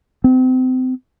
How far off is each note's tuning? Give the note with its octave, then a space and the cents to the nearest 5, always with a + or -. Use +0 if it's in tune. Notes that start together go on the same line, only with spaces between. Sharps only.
C4 -30